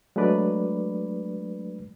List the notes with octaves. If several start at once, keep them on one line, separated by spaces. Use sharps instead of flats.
F#3 G#3 A3 D4 B4 D5